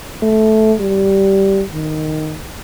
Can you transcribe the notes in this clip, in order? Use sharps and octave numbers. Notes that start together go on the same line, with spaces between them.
A3
G3
D#3